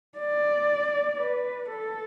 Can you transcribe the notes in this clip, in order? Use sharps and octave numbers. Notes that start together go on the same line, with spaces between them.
D5
B4
A4